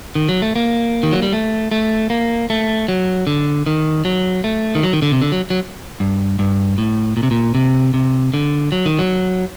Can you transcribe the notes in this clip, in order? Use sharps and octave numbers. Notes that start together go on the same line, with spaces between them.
D#3
F#3
A3
A#3
D#3
F#3
G3
A3
A3
A#3
A3
F#3
D3
D#3
F#3
A3
D#3
F#3
D#3
D3
C3
D3
F#3
F#3
G2
G2
A2
A#2
C3
A#2
C3
C3
D3
F#3
D#3
F#3